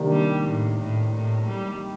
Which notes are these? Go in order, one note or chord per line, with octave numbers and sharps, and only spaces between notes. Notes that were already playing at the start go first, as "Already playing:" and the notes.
Already playing: C3 D#3 A#3 D4 G4
G3
A2
A2
A2
G3